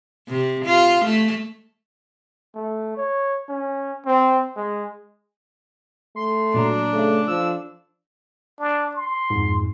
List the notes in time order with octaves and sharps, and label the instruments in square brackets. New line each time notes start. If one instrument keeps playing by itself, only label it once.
[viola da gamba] C3
F4
A3
[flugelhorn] A3
C#5
C#4
C4
G#3
[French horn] A3 [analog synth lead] C6
[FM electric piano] A#2 F#3 A#5 [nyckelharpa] D4
[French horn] C#3 [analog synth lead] A3 [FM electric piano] A4
[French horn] F3 [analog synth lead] E6
[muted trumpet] D4
C6
[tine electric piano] F2 G#2